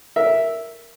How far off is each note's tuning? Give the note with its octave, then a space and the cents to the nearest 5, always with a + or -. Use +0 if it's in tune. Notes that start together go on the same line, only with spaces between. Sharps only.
A#4 +0 E5 -5